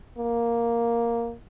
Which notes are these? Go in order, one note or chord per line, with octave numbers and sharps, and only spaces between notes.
A#3